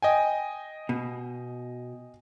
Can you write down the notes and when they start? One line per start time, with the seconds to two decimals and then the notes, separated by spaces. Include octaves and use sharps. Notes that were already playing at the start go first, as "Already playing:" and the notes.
0.02 D#5 G5 G#5
0.89 B2